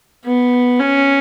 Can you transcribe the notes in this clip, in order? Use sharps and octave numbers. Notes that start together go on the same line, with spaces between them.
B3
C#4